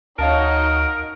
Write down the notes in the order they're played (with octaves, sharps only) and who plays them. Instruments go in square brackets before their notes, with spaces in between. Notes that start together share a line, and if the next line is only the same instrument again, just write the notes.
[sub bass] D2 [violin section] D#4 F#4 D#5 [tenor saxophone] A#4 [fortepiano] C#5 F5 A5